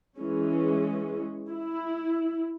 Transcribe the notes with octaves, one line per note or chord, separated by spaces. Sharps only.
E3 G#3 C#4
E4